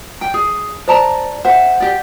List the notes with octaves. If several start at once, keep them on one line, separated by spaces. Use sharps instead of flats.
G5
G#4
C5 D5 A5 A#5
C5 E5 F#5
G4 D5